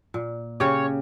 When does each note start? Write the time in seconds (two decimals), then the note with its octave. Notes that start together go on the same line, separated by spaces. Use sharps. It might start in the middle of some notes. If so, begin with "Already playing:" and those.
0.14 A#2
0.60 C#3 G4 C#5